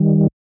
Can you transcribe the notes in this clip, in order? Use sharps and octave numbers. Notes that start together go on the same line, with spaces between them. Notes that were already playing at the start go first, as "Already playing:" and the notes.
Already playing: D#3 G3